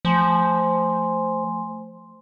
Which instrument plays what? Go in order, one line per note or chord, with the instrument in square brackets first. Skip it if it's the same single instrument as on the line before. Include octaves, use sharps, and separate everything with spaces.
[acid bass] F3 [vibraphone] A3 G#5 C6